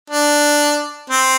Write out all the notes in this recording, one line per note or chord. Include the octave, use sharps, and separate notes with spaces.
D4
C4